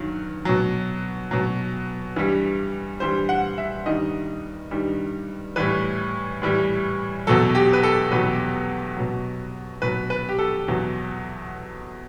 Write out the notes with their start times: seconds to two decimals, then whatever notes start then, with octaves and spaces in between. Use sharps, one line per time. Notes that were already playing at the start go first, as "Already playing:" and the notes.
Already playing: G2 D#3 F#3
0.45 B2 F#3
1.31 B2 F#3
2.16 G2 E3 G3
3.00 G2 E3 G3 C5
3.29 F#5
3.58 E5
3.86 G2 D#3 G3 D#5
4.71 G2 D#3 G3
5.56 A2 E3 G3 B4
6.42 A2 E3 G3
7.27 E2 B2 F#3 A4
7.55 G4
7.73 B4
7.83 A4
8.12 E2 B2 F#3 B4
8.97 B2 F#3
9.82 B2 F#3 B4
10.10 B4
10.29 G4
10.39 A4
10.68 E2 B2 F#3